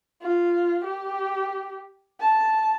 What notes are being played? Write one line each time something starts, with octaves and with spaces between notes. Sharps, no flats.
F4
G4
A5